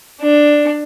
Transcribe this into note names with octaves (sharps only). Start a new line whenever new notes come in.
D4